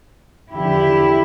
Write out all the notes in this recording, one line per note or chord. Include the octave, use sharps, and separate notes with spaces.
E2 D3 F3 E4 G4